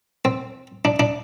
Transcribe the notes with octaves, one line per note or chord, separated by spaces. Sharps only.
C4
D4
D4